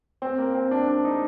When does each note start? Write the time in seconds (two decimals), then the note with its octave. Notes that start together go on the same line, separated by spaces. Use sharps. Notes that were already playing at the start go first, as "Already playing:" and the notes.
0.22 C4
0.38 A#3
0.54 C4
0.71 D4
0.88 D4
1.05 D#4